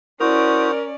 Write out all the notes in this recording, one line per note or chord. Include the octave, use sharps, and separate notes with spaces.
C#4 E4 F#4 A#4 C5 D5 D#6